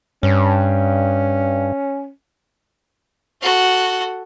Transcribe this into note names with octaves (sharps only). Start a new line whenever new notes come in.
G2 C#4
F#4 A4